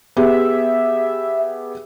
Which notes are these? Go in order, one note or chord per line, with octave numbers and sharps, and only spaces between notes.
B3 G4 G#4 E5